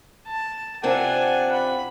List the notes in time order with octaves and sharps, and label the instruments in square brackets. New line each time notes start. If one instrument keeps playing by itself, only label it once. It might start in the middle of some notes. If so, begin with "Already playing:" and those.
[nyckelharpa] A5
[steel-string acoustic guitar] C3 C4 F4 [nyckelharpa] D4 G#5 [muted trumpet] F#5
[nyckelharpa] B5